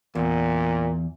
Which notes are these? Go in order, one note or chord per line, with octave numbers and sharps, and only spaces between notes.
E2 A#2